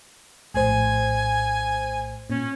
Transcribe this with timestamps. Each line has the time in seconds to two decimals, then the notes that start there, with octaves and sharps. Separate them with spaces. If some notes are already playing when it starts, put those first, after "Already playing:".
0.54 A#1 A2 C5 G#5
2.30 A#2 C#4